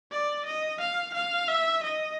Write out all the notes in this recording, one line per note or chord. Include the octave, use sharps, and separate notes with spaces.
D5
D#5
F5
F5
E5
D#5